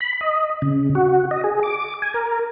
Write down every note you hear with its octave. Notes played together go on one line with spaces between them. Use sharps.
B5
D#5
C#3
F#4
D#5
G#4
D6
G#5
A#4